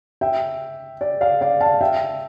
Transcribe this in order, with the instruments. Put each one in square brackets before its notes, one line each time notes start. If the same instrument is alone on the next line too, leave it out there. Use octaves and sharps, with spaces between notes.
[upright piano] E5 G5
D5
D5 F5
D5 F5
F5 A5
E5 G5